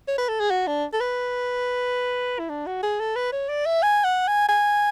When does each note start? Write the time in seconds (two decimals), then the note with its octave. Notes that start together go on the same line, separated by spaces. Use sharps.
0.08 C#5
0.18 B4
0.29 A4
0.40 G#4
0.50 F#4
0.67 D4
0.93 A4
1.00 B4
2.39 E4
2.49 D4
2.66 F#4
2.83 G#4
3.00 A4
3.16 B4
3.32 C#5
3.49 D5
3.66 E5
3.83 G#5
4.04 F#5
4.27 G#5
4.49 G#5